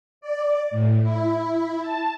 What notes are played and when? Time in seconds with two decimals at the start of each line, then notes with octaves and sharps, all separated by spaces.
0.21 D5
0.71 A2
1.02 E4
1.81 A5